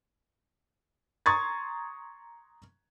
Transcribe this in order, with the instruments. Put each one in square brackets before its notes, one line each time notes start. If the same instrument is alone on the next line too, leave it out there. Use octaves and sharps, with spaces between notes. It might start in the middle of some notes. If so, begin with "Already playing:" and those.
[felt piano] A#5 C6 C#6 D#6 G#6 A6